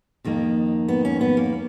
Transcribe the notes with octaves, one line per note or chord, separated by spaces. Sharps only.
F2 D#3 A#3
B3
C#4
B3
A#3